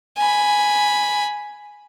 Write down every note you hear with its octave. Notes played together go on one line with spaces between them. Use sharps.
G#5 B5